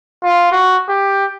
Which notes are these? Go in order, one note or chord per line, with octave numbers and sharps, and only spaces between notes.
F4
F#4
G4